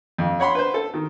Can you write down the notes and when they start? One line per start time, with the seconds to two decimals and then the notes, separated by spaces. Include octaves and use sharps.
0.18 F2
0.40 C#5 F#5 B5 C6
0.55 B4 C5
0.74 A4
0.94 D#3